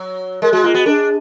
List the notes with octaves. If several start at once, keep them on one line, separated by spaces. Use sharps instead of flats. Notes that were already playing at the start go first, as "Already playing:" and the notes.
Already playing: F#3
G#3 A#4
G#3 F#4
A#3 F4
B3 F#4
D4 G#4 A#4